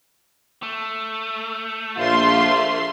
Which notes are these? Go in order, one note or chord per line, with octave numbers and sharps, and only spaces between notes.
A3
A#1 F4 E5 C6